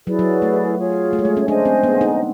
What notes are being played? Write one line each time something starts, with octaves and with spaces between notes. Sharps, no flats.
F#3 E4 G#4 B4 D5
F#3
A3
F4 G#4 C#5
A3
G#3
A3
C#4
D4 G#4 C5 D#5 G#5
C4
B3
D#4